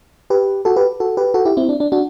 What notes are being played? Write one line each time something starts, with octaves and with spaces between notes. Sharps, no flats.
G4 B4
F#4 A4
G4 B4
F#4 A4
G4 B4
F#4 A4
E4 G4
C4 E4
D4
D4
D4 F#4